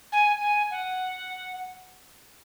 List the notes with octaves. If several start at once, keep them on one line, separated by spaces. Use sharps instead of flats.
G#5
G#5
F#5